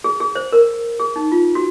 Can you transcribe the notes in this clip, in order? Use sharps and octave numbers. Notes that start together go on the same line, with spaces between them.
G#4
G#4
C5
A#4
G#4
D#4
F4
F#4